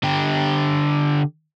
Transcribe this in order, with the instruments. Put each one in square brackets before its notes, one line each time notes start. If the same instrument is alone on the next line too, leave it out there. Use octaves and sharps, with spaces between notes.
[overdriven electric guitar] D3 G4